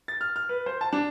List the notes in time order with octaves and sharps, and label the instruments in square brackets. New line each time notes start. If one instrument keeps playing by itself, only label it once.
[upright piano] A6
F6
F6
B4
C5
A5
D4